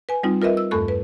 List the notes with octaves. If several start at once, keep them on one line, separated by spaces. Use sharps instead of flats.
B4 G#5
G3 C4 D#4 F4
F4 A#4 B4 D#5 E5
E6
E2 G2 A3 A4 C#6 F#6
B4